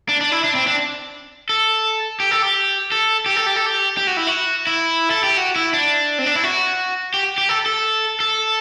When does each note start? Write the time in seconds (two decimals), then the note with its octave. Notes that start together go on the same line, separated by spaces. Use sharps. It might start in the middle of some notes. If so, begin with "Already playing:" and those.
0.09 D4
0.21 D4
0.32 E4
0.44 D4
0.55 C4
0.67 D4
1.49 A4
2.20 G4
2.31 A4
2.43 G4
2.92 A4
3.26 G4
3.36 A4
3.46 G4
3.56 A4
3.66 G4
3.97 G4
4.07 F#4
4.17 E4
4.27 F#4
4.67 E4
5.11 A4
5.24 G4
5.37 F#4
5.56 E4
5.73 D4
6.19 C4
6.26 D4
6.35 E4
6.44 F#4
7.14 G4
7.38 G4
7.49 A4
7.66 A4
8.20 A4